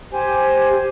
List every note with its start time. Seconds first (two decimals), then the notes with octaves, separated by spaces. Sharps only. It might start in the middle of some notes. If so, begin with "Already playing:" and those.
0.13 G4 C5 G#5